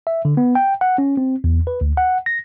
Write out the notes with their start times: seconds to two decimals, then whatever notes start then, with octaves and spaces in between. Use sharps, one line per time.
0.07 E5
0.25 D3
0.37 B3
0.55 G5
0.81 F#5
0.98 C#4
1.17 C4
1.44 E2
1.67 B4
1.81 D2
1.97 F#5
2.26 A#6